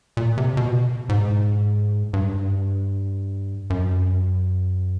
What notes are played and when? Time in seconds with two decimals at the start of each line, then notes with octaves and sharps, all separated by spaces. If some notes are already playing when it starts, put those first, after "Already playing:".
0.17 A#2
0.38 C3
0.57 B2
1.09 G#2
2.13 G2
3.70 F#2